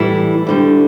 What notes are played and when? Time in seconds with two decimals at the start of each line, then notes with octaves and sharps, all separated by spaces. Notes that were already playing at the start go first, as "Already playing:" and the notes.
Already playing: A2 E3 G3 E4
0.47 D2 D3 G3